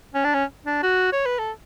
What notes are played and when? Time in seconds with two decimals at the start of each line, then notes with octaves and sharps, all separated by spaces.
0.14 C#4
0.24 D4
0.34 C#4
0.66 D4
0.83 F#4
1.12 C#5
1.26 B4
1.39 A4